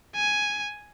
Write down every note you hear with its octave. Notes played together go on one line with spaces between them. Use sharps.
G#5